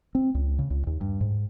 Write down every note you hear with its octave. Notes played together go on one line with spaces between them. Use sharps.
C4
C#2
C#3
C#2
D#2
G2
G#2